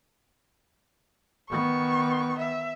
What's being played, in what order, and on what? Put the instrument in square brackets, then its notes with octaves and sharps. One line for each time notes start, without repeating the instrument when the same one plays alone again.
[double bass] D#3 B3 [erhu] C#6
[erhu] E5